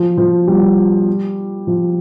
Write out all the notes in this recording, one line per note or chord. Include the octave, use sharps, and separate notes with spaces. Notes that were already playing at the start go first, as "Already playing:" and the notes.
Already playing: F3
F3
G3
F3